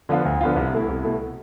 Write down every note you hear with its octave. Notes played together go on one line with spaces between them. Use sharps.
D3 F3 B3 F4
D2
D3 F3 B3 F4
C2
B2 A3 E4
C2
B2 A3 E4